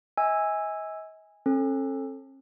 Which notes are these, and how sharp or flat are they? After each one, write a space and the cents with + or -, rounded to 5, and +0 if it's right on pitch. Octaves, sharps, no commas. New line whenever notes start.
D#5 +45 G#5 -10 E6 +0
C#4 -45 A4 +0